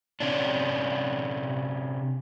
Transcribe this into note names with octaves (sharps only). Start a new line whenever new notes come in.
C3 C#4 D4